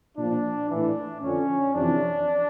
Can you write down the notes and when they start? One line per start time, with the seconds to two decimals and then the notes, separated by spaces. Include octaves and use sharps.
0.17 A#2 F3 D4
0.68 A2 E3 D4
1.21 F2 D3 F3 C#4
1.73 F2 C3 E3 D4